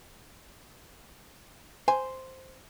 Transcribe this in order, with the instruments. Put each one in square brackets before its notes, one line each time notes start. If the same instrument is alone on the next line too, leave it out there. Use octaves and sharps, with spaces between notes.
[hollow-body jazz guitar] C5 [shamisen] G#5